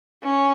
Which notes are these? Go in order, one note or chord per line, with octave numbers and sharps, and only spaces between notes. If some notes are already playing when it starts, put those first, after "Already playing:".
C#4